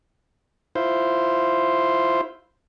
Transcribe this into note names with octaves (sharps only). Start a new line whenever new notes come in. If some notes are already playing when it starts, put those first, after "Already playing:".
E4 F4 C5